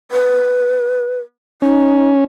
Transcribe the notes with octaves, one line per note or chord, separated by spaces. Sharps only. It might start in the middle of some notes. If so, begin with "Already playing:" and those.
B4
C#4 D#4